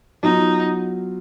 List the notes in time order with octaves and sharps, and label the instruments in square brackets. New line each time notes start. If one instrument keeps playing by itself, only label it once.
[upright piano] F#3 B3 F4 [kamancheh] D#4